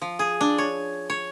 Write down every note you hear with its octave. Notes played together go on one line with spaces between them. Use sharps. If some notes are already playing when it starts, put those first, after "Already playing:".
F3
G#4
D4
C#5
C#5